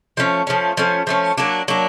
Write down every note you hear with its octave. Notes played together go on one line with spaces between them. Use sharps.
F3 A3 C#4
F3 A3 C#4
F3 A3 C#4
F3 A3 C#4
F#3 A#3 D4
F#3 A#3 D4